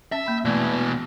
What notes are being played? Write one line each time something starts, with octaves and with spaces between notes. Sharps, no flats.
C#4 E5 A5
A#3 B5
B2 E3 A3 D5